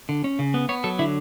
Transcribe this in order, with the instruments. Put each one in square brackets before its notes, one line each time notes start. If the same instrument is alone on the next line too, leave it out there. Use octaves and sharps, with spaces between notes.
[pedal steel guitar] D3
C#4
C#3
B3
B3 C#5
F#3 A4
D3 E4